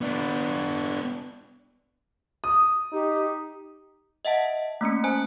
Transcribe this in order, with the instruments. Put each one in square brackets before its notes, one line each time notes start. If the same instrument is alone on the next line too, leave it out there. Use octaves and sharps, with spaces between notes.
[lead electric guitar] B3 D4
[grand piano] D#6
[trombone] D#4 [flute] G4
[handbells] D#5 E5 F#5 A5
A3 A#3 C#4 C#7
C5 G#5 A5 F#6